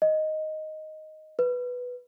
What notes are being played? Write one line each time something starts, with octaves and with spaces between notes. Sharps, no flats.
D#5
B4